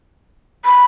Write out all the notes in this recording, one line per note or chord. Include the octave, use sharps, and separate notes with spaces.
B5